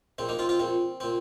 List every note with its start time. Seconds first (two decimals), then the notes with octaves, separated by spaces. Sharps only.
0.18 A#1 A#2 C4
0.29 A#3 D#4
0.39 C4 F4
0.49 C4 F4
0.59 A#1 A#2 C4
1.00 A#2 C4